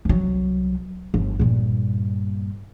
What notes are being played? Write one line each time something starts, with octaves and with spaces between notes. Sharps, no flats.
C2 F#3
G1
G2 A#2